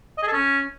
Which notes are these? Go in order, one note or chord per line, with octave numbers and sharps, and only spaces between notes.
D#5
G#4
A4
C#4